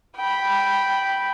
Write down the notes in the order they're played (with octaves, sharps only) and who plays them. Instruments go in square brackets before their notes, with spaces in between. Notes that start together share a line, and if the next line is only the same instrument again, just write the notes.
[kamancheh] G5 B5